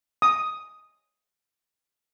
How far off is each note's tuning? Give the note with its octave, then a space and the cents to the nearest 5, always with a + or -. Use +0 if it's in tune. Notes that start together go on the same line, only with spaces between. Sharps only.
D#6 +5